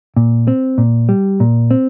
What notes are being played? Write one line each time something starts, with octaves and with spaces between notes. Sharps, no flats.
A#2
C4
A#2
G3
A#2
C4